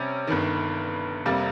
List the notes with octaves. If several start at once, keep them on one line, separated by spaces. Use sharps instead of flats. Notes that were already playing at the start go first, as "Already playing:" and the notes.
Already playing: C3 G3 C#4
G1 G2 D#3
F1 F2 C3 G3 A#3